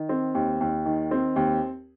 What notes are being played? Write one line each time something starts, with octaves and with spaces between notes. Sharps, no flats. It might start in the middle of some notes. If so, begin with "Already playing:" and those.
Already playing: D#3
C4
D#2
D#2
D#3
C4
D#2